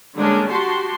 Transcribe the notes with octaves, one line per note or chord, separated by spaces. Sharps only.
D3 G3 G#3 A#3 C#4 D4
F#4 G4 A5 C6